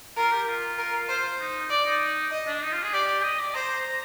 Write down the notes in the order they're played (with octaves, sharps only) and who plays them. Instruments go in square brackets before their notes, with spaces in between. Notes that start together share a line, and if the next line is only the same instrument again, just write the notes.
[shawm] F4 [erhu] A#4
[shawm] G4
F4
[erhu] A#4
C5
[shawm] D#4
[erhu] D5
[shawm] D#4
[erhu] D#5
[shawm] D4
D#4
F4
G#4
[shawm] G4 [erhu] D5
[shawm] D#5
D5
[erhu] C5 [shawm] A#5